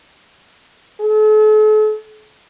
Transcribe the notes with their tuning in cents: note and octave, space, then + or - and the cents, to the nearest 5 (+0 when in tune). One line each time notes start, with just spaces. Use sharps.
A4 -45